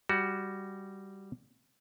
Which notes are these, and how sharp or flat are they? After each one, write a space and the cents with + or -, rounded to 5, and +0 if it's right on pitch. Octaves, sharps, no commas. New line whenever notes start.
G3 +0 F#4 +10